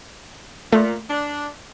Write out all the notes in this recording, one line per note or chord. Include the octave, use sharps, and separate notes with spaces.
A#2 A3
D4